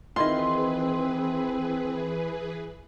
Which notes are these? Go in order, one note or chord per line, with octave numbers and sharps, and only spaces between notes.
D#3 E3 C4 E4 F4 G#4 B4 C6